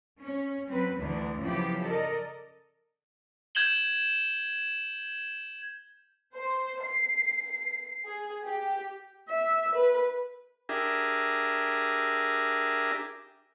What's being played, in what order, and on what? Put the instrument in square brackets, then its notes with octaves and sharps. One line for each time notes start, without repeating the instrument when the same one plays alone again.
[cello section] C#4
F#3 C4 B4
D2 D3 E3
C#3 F3 F#3 B3 E4 G4
A4 A#4 D5 D#5
[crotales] G6 G#6 E7 F#7 G7
[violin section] C5
C7
G#4
G4
[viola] E5
B4
[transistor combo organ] D4 G4 G#4 A#4 E5